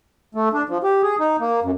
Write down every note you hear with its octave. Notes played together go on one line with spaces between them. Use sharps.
A3
D4
F3
G4
G#4
D#4
A#3
F#2